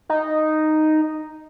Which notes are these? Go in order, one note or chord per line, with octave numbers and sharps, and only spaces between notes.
D#4